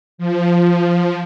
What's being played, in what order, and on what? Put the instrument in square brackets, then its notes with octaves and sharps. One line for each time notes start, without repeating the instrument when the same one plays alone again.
[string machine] F3